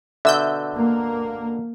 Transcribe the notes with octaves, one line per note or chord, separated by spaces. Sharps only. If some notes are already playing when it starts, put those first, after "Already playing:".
B2 D3 E5 E6 G6
A#3